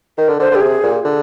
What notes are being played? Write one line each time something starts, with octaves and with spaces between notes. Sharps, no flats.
D#3 A#4
D3
D3 C5
D3
G4
C3 G#4
A#2
D3